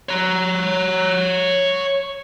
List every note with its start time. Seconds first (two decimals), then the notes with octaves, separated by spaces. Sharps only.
0.09 C#5 A#5